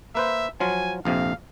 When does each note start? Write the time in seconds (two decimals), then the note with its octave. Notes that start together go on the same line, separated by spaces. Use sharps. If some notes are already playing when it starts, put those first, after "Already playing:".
0.15 A#3 B4 C5 E5
0.60 F3 F#3 F4 G#5
1.05 A#1 F2 C3 F5